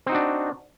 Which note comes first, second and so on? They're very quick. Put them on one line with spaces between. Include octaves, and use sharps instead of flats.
C4 D#4 F#4 D4